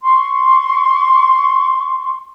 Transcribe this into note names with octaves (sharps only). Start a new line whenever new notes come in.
C6 C#6